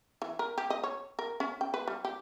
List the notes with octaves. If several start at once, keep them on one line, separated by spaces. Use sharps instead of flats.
E3
A#4
G4
D#5
C#5
A#4
C#4
G5
B4
G3
G4